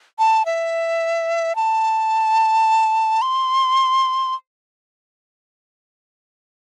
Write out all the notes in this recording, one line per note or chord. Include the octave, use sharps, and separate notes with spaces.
A5
E5
A5
C6